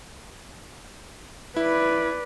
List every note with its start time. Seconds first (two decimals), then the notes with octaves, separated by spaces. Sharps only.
1.56 E4 B4 D5